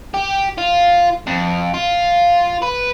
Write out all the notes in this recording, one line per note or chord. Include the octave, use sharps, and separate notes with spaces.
G4
F4
F2
F4
B4